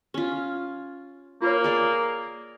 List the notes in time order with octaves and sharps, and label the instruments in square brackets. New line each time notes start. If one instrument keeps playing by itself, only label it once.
[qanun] C#4 F4 [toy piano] G4
[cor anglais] A#3 [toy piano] F4 B4 C#5
[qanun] G#4 D5